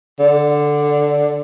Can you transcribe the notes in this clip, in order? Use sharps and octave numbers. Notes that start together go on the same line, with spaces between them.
D3